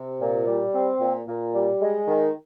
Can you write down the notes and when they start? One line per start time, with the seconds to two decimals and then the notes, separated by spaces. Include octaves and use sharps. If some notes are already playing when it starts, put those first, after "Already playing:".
Already playing: C3
0.20 A#2
0.47 G3
0.73 C4
1.00 A#2
1.27 A#2
1.54 G3
1.81 G#3
2.08 D#3